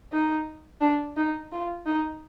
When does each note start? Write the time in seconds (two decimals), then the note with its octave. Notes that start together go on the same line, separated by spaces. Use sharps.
0.12 D#4
0.81 D4
1.16 D#4
1.52 F4
1.86 D#4